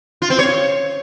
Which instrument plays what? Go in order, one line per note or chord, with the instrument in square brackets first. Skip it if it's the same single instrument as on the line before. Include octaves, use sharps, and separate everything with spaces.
[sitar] F4
C4
C#5